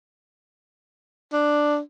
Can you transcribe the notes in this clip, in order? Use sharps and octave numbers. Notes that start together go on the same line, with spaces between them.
D4